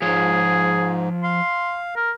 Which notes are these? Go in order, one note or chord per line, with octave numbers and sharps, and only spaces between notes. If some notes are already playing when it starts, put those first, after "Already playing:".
G#2 F3 G#4 C#5
F5 C6
A#4